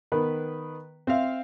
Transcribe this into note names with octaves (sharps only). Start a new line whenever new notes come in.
D#3 B3 B4
C4 E5 F5